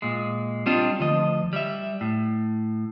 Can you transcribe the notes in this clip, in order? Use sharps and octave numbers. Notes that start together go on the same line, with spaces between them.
A#2 G#3
G3 A#3 C4 D4 F4 D#5
D2 F3 D#5
G3 E5
A2